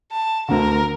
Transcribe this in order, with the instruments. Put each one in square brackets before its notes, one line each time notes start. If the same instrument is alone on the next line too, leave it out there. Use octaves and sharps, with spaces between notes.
[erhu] A5
[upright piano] D2 D3 [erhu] A#4